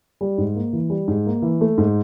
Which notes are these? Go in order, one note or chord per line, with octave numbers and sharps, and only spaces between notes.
G3
G#2
A#3
E3
G3
G#2
A#3
E3
A3
G#2